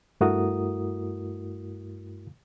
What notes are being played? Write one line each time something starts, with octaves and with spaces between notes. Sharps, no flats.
G2 A3 E4 F#4 A#4 D#6